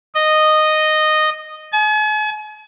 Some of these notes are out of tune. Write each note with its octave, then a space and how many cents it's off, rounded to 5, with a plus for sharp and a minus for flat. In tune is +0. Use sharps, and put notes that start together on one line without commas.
D#5 -10
G#5 +45